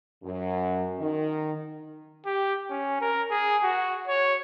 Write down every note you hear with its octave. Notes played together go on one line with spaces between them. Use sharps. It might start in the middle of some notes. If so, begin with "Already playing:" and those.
F#2
D#3
G4
C#4
A#4
G#4
F#4
C#5